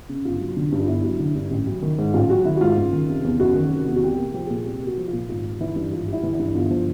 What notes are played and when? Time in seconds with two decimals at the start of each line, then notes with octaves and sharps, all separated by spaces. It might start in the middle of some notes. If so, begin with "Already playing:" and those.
0.09 C#3
0.25 G1 F4
0.41 F#3
0.57 D3
0.72 G2
0.79 F4
0.88 G1 E4
1.04 F#3
1.19 D3
1.35 G2
1.51 A1
1.67 F#3
1.82 D#3
1.98 G#2
2.14 A1 F4
2.30 F#3 F#4
2.45 D#3 E4
2.56 F#4
2.61 G#2 F4
2.77 F#1
2.93 D#3
3.08 C3
3.24 E2
3.40 F#1 F#4
3.56 D#3
3.72 C3
3.87 E2
3.96 F#4
4.03 C2 G4
4.19 A#3
4.34 F3 G4
4.45 A#2 G#4
4.66 C2 G4
4.82 A#3
4.87 F#4
4.97 F3
5.08 F4
5.13 A#2
5.29 G#1 F4
5.45 G3
5.60 E3 E4
5.76 G2
5.92 G#1 F4
6.07 G3
6.13 E4
6.23 E3
6.34 E4
6.39 G2
6.55 G1 F4
6.71 F3